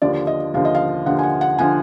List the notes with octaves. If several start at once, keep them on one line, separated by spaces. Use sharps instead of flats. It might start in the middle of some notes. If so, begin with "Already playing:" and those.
D#2 D3 F3 D5
D#5
D#2 D3 F3 F5
D#5
F5
D#2 D3 F3 F#5
G#5
F#5
F#5
D3 F3 G#5